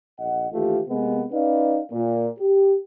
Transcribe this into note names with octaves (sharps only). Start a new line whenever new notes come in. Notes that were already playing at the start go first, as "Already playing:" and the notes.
A#1 D#5 F#5
D#2 E3 A3 F4 G4
C3 G#3 A#3 B3
C#4 D#4 B4 D5 F5
A#2
G4